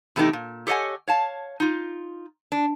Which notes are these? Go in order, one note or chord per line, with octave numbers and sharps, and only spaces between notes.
E2 C3 A3 B3 D#4 G4
A#2
G4 A4 C#5 D#5 F#5 G#5
C#5 F5 A5
D#4 F4
D4